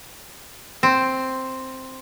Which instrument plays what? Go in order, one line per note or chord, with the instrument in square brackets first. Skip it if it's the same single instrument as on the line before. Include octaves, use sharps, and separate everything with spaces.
[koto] C4